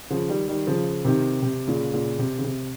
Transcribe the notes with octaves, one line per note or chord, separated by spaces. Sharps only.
C#3 F3
D#3 G3
D#3 G3
C#3 F3
C3 D#3
C3
A#2 C#3
A#2 C#3
C3
C#3
C3